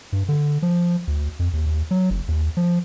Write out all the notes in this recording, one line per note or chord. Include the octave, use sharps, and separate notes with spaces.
G2
D3
F3
D2
F2
D#2
D#2
F#3
F#1
D#2
F3